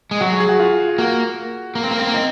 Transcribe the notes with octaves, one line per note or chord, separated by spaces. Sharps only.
G#3
F#3 F#4
G#4
G#4
F#4
F4
A#3 F#4
A#3
C4
A#3
C4
A#3
C4 D#4